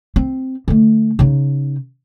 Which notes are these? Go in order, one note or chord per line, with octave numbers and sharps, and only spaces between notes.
C4
D3 A3
C#3 D#4